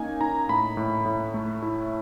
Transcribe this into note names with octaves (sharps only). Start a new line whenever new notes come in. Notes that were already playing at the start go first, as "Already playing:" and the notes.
Already playing: A#3 C#4 D#4 G#5
D#4 A#5
A2 B5
A2
A2
A3
E4